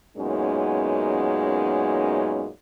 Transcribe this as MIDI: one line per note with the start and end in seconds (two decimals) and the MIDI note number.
0.16 2.47 42
0.16 2.47 46
0.16 2.47 56
0.16 2.47 59
0.16 2.47 61
0.16 2.47 63